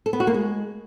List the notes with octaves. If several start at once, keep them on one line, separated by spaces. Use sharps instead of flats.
A4
B3
F#4
A#3
G#3